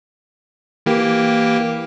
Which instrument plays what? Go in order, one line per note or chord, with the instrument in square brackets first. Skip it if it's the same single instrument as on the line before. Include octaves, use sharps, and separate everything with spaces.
[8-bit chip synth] E3 A#3 G4